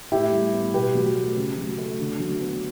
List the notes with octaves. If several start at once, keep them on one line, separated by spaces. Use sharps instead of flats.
A2 E4 G4
G3
B3
B2 G4 B4
F#3
A3
C#3
F#3
A3
D3
F#3
B3